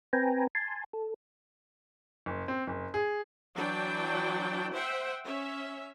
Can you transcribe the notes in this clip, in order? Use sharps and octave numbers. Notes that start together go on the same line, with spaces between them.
C4 B4 G5 G#5 A#5
G#5 A5 C6
A4
F#1
C4
F#1
G#4
E3 F#3 D4 G5
C5 E5 F#5 G5
C#4 C#5 E5